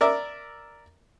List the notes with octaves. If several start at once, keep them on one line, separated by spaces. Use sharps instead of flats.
A#4 D5 E5